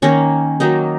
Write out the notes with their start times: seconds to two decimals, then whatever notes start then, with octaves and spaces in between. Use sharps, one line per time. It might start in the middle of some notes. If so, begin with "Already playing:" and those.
0.02 D#3 A#3 C#4 C#5
0.60 D#3 F#3 A#3 D#4 D#5